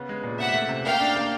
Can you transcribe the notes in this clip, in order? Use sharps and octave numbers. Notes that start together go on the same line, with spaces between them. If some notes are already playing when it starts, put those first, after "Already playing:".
Already playing: C#3 B3
G#3
A#2
C3 E5 F#5
A3
C3
A#3 F5 G5
D4
A#3